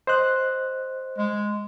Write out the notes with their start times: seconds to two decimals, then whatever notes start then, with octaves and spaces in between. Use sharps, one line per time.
0.07 C5 D#5 F#6
1.18 G#3